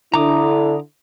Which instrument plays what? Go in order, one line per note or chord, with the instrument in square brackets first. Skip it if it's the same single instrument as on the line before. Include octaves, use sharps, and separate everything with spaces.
[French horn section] D3 E4 [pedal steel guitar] A#5 D6 D#6